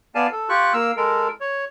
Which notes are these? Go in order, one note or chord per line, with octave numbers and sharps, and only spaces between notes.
B3 D5 F5 G#5 A5
A4
F4 G4 C#6 F#6
A#3 F5 E6
G#3 A4 A#4
C#5